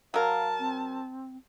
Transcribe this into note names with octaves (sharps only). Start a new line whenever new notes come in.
F#3 A#4 F5 A5
C4